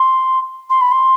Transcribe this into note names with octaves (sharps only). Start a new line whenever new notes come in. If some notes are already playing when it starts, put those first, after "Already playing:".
Already playing: C6
C6
B5
C6